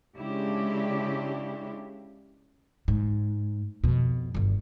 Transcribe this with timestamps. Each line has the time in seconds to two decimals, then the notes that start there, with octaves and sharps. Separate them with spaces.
0.17 C#3 G#3 D4 E4 G4
2.88 G#2
3.84 F2 B2
4.35 G1 G2